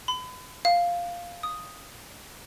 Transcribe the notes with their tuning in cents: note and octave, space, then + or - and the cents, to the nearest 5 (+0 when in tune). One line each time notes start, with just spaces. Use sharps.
B5 +35
F5 +0
D#6 +0